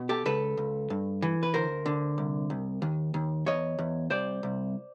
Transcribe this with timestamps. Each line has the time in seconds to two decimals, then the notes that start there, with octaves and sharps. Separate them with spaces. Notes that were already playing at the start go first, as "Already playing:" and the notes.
Already playing: B2
0.09 G4 A4
0.26 C#2 A4 B4
0.57 C#2
0.90 G2
1.22 E3
1.43 B4
1.54 D2 A#4 C5
1.86 D3
2.18 C2
2.50 C2
2.82 D#2
3.14 D#2
3.46 E2 C#5 D#5
3.79 E2
4.10 C2 C5 D5
4.43 C2